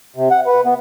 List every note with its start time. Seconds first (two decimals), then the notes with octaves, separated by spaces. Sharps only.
0.16 C3
0.31 F#5
0.46 B4
0.65 B3